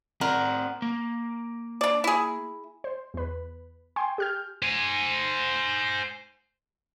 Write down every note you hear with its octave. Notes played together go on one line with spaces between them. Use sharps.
C4 A#4 D5 F#5
A#3
D4 D5
E4 G#4
C5
E2 B4
G5 G#5 C6
G4 F6 G6
C5 G#5